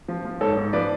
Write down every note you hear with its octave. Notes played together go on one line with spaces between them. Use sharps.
F3
F3
G#2 A4 C#5
G#2
F3 B4 D5